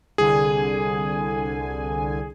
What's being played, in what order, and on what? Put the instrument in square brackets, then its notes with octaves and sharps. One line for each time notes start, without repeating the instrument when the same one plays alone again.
[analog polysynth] C2 D3 G#5 [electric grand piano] G#4